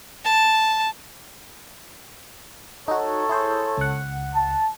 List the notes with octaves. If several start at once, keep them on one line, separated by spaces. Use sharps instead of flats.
A5
D#4 F#4 A4 C#5
E4 G#4 C5
C#2 F#5
A5